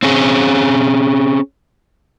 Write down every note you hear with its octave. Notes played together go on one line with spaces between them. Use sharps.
C4 C#4 G#4